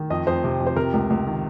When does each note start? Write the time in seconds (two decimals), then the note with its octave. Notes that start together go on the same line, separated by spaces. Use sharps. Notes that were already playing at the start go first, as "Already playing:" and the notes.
Already playing: D#3
0.10 F2 D#5
0.27 F2 C5
0.44 C3
0.60 F2
0.67 C5
0.76 C3 A#4
0.94 C#2
1.10 C#2
1.27 D#3